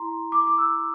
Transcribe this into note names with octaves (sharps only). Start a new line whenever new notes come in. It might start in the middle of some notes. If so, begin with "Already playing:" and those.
Already playing: E4 A#5 C6
D6
D6
E6